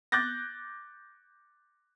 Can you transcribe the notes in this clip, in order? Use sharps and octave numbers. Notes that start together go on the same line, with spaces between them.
D6 F#6 G6 A6 A#6